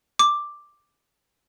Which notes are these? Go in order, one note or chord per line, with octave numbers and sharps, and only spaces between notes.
D6